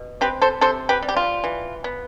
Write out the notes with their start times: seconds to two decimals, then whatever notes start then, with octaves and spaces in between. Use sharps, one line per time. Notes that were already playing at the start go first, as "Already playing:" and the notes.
Already playing: B2
0.21 C4 G4 B4
0.42 A4 C5
0.61 C3 A4 C5
0.89 G4 B4
1.02 G3
1.08 G4
1.16 F4
1.44 E3
1.84 B3